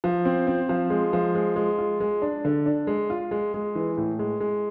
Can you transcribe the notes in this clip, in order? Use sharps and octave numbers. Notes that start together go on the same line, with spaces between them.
F3
C4
C4
F3
G#3
F3
G#3
G#3
F4
G#3
D4
D3
D4
G#3
F4
G#3
G#3
E3
A2
G#3
G#3